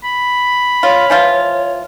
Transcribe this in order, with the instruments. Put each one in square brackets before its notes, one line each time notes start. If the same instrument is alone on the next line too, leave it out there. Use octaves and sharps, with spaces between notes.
[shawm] B5
[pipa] F4 [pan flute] C#5
[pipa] E3 F3 F4